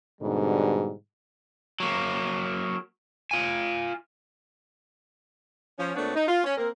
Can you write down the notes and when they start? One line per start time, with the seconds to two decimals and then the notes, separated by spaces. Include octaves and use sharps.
0.22 G#2 B2 D3 G3
1.80 F#3 A#3
3.31 F4 G#5
5.79 F3 C#4
5.96 A#2 A3 B3 C4 D4 C#5
6.16 D#4
6.28 F4
6.44 C#4
6.57 A#3 C4 A#4